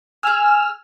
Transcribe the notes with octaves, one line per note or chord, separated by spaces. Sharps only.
G#4 G#5 E6 F6